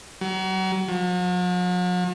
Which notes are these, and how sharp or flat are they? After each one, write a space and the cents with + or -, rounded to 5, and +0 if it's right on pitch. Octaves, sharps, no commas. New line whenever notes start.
F#3 +35
F#3 -45